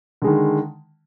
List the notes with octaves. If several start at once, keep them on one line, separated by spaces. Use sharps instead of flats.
D3 D#3 G#3